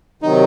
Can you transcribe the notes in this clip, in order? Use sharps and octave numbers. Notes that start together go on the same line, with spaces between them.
C3 D#3 F#3 D#4